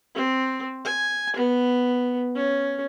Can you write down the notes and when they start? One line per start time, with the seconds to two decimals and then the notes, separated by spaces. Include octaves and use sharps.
0.15 C4
0.85 G#5
1.36 B3
2.35 C#4